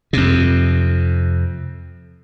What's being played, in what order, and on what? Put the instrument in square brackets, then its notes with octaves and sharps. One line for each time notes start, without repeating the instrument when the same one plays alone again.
[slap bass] F2 C3